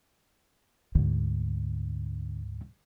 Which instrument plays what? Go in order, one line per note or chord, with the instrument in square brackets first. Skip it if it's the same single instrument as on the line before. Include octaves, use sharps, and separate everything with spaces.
[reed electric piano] D2 G#2 [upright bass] D3